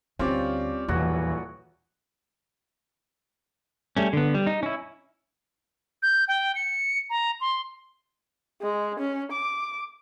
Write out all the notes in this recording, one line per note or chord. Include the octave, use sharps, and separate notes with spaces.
D2 D3 G3 C4 C#4 F4 D5
D#1 A#1 E2 E3 F#4 C#5
G3 A3 C#4
D3 B3
G3
D#4
C#4 E4
G6
G5
C#7
A#5
C6
G#3
C#4
D6